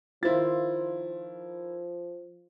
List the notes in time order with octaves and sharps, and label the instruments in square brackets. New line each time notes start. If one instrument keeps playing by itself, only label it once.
[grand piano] D#3 E4 A6 [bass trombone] F3 [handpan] F4 C5